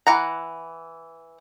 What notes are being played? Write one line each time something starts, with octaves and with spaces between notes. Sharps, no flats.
E3 F#5 A#5